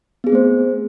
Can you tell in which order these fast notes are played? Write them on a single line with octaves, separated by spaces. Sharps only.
B3 G#4 C4 A3 C5